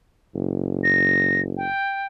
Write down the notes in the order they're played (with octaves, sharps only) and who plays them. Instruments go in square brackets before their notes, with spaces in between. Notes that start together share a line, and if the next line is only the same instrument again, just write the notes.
[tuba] F#1
[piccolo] A#6
G5